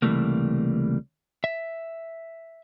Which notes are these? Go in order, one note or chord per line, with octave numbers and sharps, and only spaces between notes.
C#2 C3 E3 G3 A3 A#3
E5